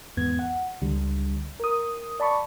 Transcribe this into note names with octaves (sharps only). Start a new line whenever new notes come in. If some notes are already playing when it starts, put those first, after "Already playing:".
E2 G#2 B3 G#6
F#5
C#2 D3 G3
A#4 D#6
D5 A5 B5 C#6